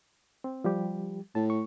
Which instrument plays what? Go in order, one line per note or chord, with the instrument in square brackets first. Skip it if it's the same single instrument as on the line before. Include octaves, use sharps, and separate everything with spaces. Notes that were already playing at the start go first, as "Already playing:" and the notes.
[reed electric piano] C4
F3 G3 G4
[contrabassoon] A2 [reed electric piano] A5
[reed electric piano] C#6